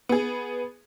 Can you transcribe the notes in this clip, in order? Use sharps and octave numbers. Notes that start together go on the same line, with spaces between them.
B3 G#4